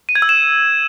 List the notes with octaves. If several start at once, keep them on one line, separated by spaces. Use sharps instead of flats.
D#7
G#6
E6
E7